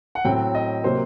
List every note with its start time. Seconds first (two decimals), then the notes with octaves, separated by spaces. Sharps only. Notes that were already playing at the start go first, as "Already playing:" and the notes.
0.15 F#5
0.24 A2 F#3 C4 G5
0.55 D#5
0.84 C3 F#3 A#3 C5